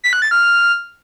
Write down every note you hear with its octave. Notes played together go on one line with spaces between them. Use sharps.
B6
F#6
A6
F6